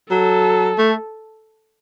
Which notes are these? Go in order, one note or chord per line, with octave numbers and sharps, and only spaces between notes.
F#3 A4
A3